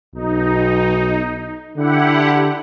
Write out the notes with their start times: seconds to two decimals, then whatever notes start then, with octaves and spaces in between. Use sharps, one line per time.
0.15 B1 D#4
1.77 D3 E4 G4 F#5